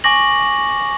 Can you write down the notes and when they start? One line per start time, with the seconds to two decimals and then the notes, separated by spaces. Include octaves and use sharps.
0.04 G#5 C#6 D6 A#6 F#7